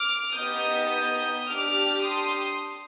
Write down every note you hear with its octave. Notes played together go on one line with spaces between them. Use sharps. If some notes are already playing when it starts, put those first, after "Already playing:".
Already playing: D6 F6
B3 D#4 G4 D#6 G6
D4 G4 D6 F6
C6 D#6